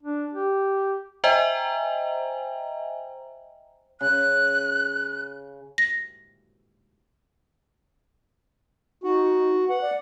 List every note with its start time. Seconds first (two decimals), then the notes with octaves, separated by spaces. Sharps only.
0.03 D4
0.33 G4
1.24 C5 D#5 E5 G5 G#5 A#5
4.01 C#3 F#6
5.78 A#6
9.04 D#4 F#4
9.69 B4 F#5
9.81 D5